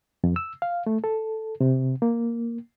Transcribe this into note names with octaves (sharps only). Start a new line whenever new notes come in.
F2
E6
F5
A3
A4
C3
A#3